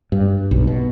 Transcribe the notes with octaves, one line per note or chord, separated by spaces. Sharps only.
G2
B1
B2